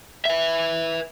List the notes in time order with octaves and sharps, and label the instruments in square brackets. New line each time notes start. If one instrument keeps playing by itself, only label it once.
[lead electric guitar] B4 E5